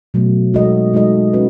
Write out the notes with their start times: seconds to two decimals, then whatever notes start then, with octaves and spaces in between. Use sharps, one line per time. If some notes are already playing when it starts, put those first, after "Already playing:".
0.14 B2 F#3 A3
0.54 G#3 D#4 F#4 A4 D#5
0.94 G#3 D#4 F#4 A4 D#5
1.33 C#4 F#4 B4